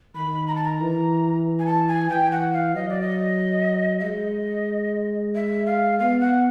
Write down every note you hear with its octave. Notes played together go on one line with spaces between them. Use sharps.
D#3 B5
A#5
A5
A#5
E3
G#5
A5
G#5
E3 G5
F#5
F5
F#3 D#5
D5
D#5
E5
G#3 D#5
E5
F5
B3 F5
F#5